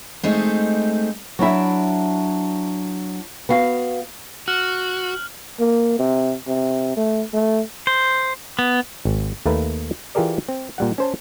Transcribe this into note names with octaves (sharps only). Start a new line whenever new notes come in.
G#3 A3 C4 D#4
F#3 D4 E4 E5
B3 F#4 F5
F#4 F6 F#6 F#7
A#3
C3
C3
A3
A3
C5
B3
G#1
D#2 A3 A#3 A#4 B4
E3 F4 G4 G#4 A#4 D5
C4
A#2 G3 F#5
C#4 C5 A5